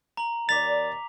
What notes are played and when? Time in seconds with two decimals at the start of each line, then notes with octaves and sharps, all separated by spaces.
0.17 A#5 F#7
0.49 D#2 D#3 D5 D6 A6 B6 F7